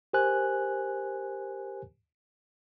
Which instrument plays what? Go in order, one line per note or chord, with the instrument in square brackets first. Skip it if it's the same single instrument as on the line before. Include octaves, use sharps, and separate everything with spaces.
[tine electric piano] G4 A#4 C5 G#5 F#6